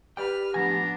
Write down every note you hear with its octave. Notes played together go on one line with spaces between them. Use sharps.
G4 B4 D5 G5 F6
A2 F3 B3 D4 G#5 A#5